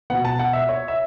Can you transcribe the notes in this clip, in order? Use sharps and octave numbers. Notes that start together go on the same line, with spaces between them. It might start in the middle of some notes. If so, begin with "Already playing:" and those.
B2 B3 F#5
A5
F#5
E5
C#5
E5